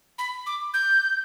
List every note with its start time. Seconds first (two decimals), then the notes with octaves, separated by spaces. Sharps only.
0.18 B5
0.46 D6
0.74 G6